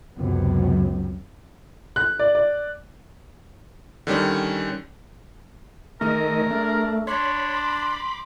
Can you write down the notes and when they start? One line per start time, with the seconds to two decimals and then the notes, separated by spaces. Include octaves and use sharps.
0.16 C#2 F#2 C3 B3
1.96 F#6
2.19 D5
2.35 D5
4.07 D3 D#3 G3 C#4
6.01 D#3 A3 G#4 A#4 D#5
6.51 A3 D4
7.07 D4 C#5 B5 C6
7.57 D6